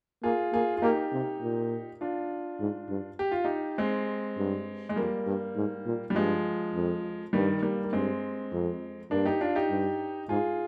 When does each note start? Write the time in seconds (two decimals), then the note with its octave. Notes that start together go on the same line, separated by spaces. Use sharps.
0.23 A#3 F4 G#4
0.53 A#3 F4 G#4
0.76 F4
0.82 A#3 D#4 G4
1.12 C3
1.42 A#2
2.01 D4 F4
2.60 G#2
2.90 G2
3.19 G4
3.32 F4
3.44 D#4 G4
3.78 G#3 C4
4.38 G2
4.89 G#3
4.96 F2 G3 A#3
5.26 G2
5.56 G#2
5.86 A#2
6.10 G3
6.15 G2 F3 G#3
6.75 F2
7.33 G2 D#3 G3
7.63 G3 A#3
7.84 A#3
7.93 G2 G#3 C4
8.52 F2
9.11 G2 A#3 D4
9.26 D#4 G4
9.41 D4 F4
9.56 D#4 G4
9.70 G2
10.29 G#2 F4 G#4